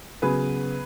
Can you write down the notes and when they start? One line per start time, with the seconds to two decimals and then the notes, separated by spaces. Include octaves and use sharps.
0.22 C#3 F#3 B3 G#4 B4